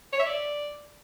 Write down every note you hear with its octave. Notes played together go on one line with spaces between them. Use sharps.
C#5
E5
D5